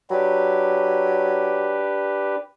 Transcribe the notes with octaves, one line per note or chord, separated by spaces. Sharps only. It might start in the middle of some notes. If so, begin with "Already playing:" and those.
F#3 D4 G4 B4